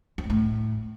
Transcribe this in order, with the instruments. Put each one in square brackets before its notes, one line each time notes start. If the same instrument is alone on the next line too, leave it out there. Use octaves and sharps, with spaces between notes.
[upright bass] F2
G#2
A2